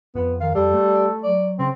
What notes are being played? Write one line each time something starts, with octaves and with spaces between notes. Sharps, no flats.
F2 B3
D#3 F5
F2 G3 A4
A3
F#3 D5
C#3 C4